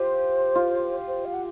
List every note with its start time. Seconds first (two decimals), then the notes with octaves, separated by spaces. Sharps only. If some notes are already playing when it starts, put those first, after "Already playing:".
Already playing: F4 G4 C5
0.55 F4
1.08 C5
1.25 F5
1.34 F#5